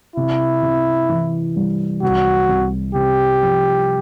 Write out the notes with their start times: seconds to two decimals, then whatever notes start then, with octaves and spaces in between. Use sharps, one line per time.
0.16 C3 E4
0.62 C3
1.09 E3
1.56 G3
2.02 C2 F#4
2.49 C2
2.95 C3 G4
3.42 F3